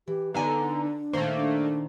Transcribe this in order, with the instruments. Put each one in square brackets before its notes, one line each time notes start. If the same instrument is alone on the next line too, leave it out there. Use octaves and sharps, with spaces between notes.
[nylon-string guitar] E3 [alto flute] G4
[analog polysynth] D3 [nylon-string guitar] B3 D#4 G#5 [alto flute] A#5
[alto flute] D4
[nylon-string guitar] A#2 D#3 C5 [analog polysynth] A3 A#3
[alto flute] D4